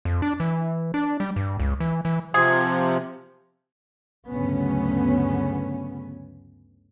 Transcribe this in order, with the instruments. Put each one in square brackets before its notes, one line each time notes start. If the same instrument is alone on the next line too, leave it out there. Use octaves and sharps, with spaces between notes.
[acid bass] F2
D4
E3
D4
G3
G2
C#2
E3
E3
[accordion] C3 F3 [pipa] G#4
[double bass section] D2 G2 C#3 F#3 B3 C#4